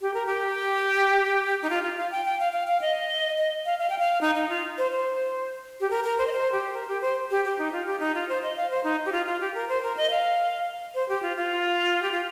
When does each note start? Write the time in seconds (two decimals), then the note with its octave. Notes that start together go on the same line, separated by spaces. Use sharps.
0.01 G4
0.14 A#4
0.26 G4
1.62 D#4
1.70 F4
1.83 F4
1.97 F5
2.11 G5
2.25 G5
2.40 F5
2.53 F5
2.67 F5
2.82 D#5
3.38 D#5
3.66 F5
3.79 F5
3.90 G5
3.99 F5
4.21 D#4
4.35 D#4
4.49 F4
4.78 C5
4.92 C5
5.81 G4
5.90 A#4
6.04 A#4
6.18 C5
6.27 D#5
6.32 C5
6.52 G4
6.73 A#4
6.88 G4
7.01 C5
7.31 G4
7.45 G4
7.59 D#4
7.72 F4
7.86 G4
8.00 D#4
8.15 F4
8.29 C5
8.42 D#5
8.56 F5
8.70 C5
8.84 D#4
9.06 G4
9.12 F4
9.26 F4
9.41 G4
9.54 A#4
9.69 C5
9.83 A#4
9.97 D#5
10.10 F5
10.95 C5
11.09 G4
11.23 F4
11.37 F4
12.03 G4
12.11 F4